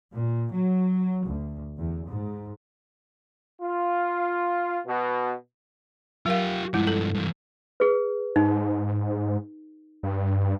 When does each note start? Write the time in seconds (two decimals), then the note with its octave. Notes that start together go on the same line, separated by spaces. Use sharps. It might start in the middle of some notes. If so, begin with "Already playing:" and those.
0.12 A#2
0.52 F#3
1.25 D2
1.78 E2
2.07 G#2
3.60 F4
4.86 B2
6.26 F#3 F4 G4 A#4 F5
6.74 G2 F3 G#3 E4
6.87 A4
7.14 G2 E3
7.80 G#4 B4
8.36 G#2 D#4
10.03 G2